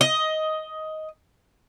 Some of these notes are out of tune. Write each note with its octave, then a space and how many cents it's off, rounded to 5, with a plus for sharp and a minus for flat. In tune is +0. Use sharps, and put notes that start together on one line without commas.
D#5 +10